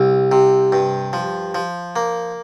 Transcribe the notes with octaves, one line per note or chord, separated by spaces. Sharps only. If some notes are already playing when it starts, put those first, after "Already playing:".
Already playing: C2
C3
G2
F3
F3
A#3